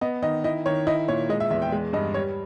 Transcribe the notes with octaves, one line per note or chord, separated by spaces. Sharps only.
B3 D#5
D#3 D#5
E4 D#5
D#3 C#5
E4 D#5
A#2 C#5
G#3 D#5
E5
E2 E5
G5
G#3
G2 D#5
G3 C#5